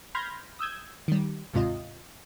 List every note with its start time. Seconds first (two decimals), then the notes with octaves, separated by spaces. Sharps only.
0.15 B5 C6 F6 G6 G#6 A#6
0.59 D#6 E6 G6 G#6
1.08 D#3 G3
1.54 G1 D#2 G#2 C3 F4 D#5